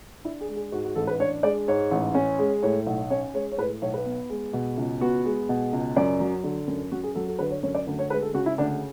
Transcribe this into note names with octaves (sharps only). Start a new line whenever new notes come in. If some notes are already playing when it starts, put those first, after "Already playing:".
D4 E4
G#4
G#3
G#4
G#2 F#4
F#4
A1 A4
B4
D4 C#5
G#3 D5
G#2 C#5
A1
C#4
G#3
A2 C#5
B1
C#4 C#5
G#3 C#5
C#5
A2 B4
B1 C#5
B4
B3
G#3
B2
C#2
B3 F#4
G#3
B2
C#2
F#2 D5
F#3
D3
F#2
F#2 F#4
G#4
F#3 A4
A4
D3 B4
C#5
F#2 C#5
D5
D2
C#5
G#3 B4
A4
C#3 F#4
E4
D2 D4